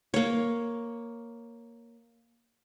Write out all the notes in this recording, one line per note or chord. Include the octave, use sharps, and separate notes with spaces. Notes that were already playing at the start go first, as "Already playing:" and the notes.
A#3 C#5